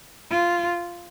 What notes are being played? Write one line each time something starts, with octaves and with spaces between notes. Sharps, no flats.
F4